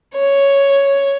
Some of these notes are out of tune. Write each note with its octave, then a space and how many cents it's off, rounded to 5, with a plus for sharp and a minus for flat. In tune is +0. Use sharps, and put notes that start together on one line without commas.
C#5 +0